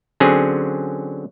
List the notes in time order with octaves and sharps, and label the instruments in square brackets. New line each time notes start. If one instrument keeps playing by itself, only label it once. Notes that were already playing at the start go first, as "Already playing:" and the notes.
[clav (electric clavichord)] D3 F#3 C4 C#4 G#4